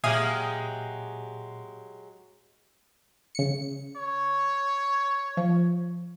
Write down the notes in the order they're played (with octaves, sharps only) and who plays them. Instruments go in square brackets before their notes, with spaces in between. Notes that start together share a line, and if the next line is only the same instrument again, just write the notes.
[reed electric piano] A#2 [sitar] F#3 G#3 G4 [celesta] E5 [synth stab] F5 G#5 D#6
[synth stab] C#3 C#7
[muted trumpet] C#5
[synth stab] F3